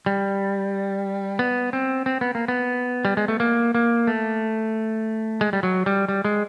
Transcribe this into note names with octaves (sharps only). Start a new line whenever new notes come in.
G3
B3
C4
C4
B3
A#3
B3
G3
G#3
A3
A#3
A#3
A3
G#3
G3
F#3
G3
G3
G#3